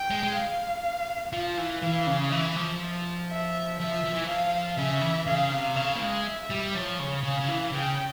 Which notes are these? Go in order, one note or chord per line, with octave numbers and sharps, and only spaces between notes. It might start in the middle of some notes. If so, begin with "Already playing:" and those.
Already playing: G5
G#3
G#3
F5
F3 F5
E3
E3 F5
C#3
E3 E5
F3
E5
F3 E5
F3
E3
F3 F5
C#3 E5
E3
C#3 F5
C3
C#3 F5
A#3
G#3
E5
G3
F3 C#5
C#3
C#3 F5
C#3
E3
C#3 G5